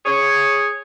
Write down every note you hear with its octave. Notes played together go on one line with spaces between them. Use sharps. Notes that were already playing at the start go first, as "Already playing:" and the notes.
G#4 C#5